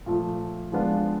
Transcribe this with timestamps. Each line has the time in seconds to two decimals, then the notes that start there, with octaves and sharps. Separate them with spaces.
0.06 A#2 F3 A3
0.72 F3 G#3 B3 D4 F4